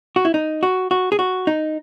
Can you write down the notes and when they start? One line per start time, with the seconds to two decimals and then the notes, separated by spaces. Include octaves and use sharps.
0.16 F#4
0.25 E4
0.34 D#4
0.63 F#4
0.91 F#4
1.12 G#4
1.19 F#4
1.47 D#4